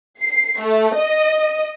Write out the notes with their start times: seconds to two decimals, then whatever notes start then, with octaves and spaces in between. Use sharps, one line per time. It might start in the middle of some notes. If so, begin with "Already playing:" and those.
0.21 C7
0.60 A3
0.94 D#5